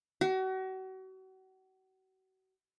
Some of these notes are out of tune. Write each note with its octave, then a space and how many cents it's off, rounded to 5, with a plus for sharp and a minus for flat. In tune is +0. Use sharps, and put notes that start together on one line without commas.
F#4 +35